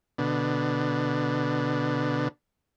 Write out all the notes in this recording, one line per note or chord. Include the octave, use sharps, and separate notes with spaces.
B2 D3